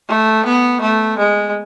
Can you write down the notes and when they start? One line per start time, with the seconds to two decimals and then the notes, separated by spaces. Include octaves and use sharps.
0.09 A3
0.45 B3
0.81 A3
1.18 G#3